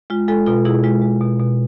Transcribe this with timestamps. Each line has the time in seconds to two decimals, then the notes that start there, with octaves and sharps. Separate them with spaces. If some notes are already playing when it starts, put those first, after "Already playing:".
0.10 G#3 F4
0.28 G#3 F4 A4
0.46 B2 F4 A4
0.65 B2 E4 G#4
0.84 G#3 F4
1.02 G#3
1.21 B2
1.40 B2